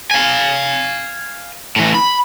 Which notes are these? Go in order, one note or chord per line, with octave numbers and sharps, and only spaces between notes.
F5 G#5
A2 E3
B5